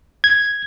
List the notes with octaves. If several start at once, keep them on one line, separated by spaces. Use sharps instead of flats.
G#6